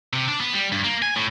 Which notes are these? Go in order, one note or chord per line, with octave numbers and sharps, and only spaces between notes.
C3
D4
B3
G3
G2
A#3
G#5
A2